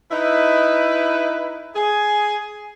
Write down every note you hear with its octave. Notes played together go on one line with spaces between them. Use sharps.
D#4 E4 B4
G#4 G#5